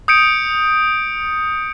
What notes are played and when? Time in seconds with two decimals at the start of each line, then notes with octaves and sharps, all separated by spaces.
0.08 D#6 G6 C#7 D7